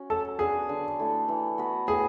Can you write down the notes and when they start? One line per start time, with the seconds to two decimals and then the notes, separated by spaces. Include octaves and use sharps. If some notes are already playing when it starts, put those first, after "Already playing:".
Already playing: C#4 F#4
0.10 F#3 A4
0.39 B3 D4 F#4 G#4
0.69 D3
0.99 A3 E4 A4
1.28 E3
1.58 B3 F#4 B4
1.87 A2 G#4